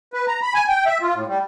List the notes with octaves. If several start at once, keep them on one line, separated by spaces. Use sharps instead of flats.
B4
A#5
B5
G#5
G5
E5
F4
A2
G3